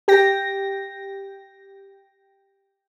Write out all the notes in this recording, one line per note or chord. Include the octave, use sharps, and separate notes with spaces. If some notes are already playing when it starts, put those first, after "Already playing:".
G4 G5 A#6